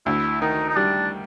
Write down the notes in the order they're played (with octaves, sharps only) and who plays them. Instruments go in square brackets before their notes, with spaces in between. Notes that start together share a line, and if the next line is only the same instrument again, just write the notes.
[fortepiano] D2 [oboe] E4
[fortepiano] D#3 [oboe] D#4
[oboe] D#4
[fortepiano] G3 [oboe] D4